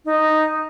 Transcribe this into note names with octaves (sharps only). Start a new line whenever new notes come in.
D#4